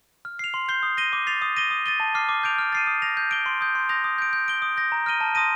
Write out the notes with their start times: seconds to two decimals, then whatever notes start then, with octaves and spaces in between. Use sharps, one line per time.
0.25 F6
0.39 C7 F7
0.54 C6
0.69 G6 C7 G7
0.83 D#6
0.97 A#6 D#7 G7
1.13 D6
1.27 A6 C7 F7
1.42 D#6
1.57 A#6 D#7 G7
1.71 D#6
1.86 A6 D#7 G7
2.00 A5
2.15 D6 F6 C7
2.29 D6
2.43 G6 D7 F7
2.58 F6
2.72 A6 C7 D#7
2.87 D#6
3.02 A#6 F7
3.17 G6
3.31 D7 G7
3.46 C6
3.61 D#6 G6
3.75 C6
3.89 D#6 G6 A#6 F7
4.04 D#6
4.18 G6 D7
4.33 G6
4.48 D7 G7
4.62 D#6
4.77 G6 A#6
4.92 A#5
5.06 F6 A#6 D#7 G7
5.21 A5
5.35 C6 D#6 A#6 D#7